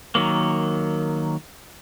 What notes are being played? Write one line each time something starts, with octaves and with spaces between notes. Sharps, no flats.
D#3 F#3 A#3